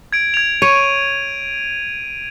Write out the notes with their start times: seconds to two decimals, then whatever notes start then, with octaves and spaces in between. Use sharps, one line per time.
0.13 G#6 D7
0.34 G#6 F7
0.62 C#5 D#7